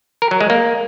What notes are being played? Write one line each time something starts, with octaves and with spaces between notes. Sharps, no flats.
A#4
F#3
G#3
A#3